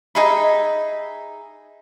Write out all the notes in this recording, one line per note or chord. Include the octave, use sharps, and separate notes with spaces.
D#4 G#4 E5 B5